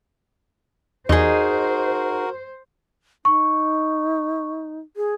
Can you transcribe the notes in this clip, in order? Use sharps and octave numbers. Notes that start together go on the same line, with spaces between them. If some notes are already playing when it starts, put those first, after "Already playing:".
E2 D#4 F#4 G#4 A#4 C5
D#4 C#6
G#4